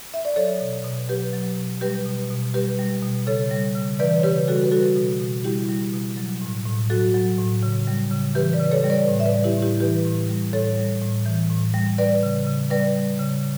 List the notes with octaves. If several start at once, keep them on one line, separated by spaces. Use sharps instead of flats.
E5
D5
F#3 A4 C#5
B2
B2
F#3 G4 B4
F#3
B2
G3 G4 B4
B2
B2
G3 G4 B4
G3
B2
C#3 A4 C#5
G3
C#3
E3 B4 D5
C#5
C#3 G4 B4
G3 F#4 A4
B4
G3 F#4 A4
B2
B2
G3 E4 G4
G3
B2
F#3
A2
A2
F#3 F#4 A4
F#3
A2
C#3
G3
C#3
E3 G4 B4
B4 D5
C#3
A4 C#5
G3
B4 D5
A2
E5
B4 D5
G3
E4 G4
A2
E4 G4
E3 G4 B4
A2
G3
A2 A4 C#5
G3
A2
E3
A2
G3
G3 B4 D5
C#3
C#3
G3 B4 D5
G3
C#3